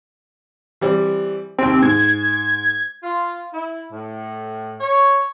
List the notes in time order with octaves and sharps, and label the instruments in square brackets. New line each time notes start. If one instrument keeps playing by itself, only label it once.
[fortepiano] E3 G3 C4
[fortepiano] D#2 C3 [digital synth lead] C4
[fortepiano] G#2 [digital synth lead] G#6
[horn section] F4
E4
A2
C#5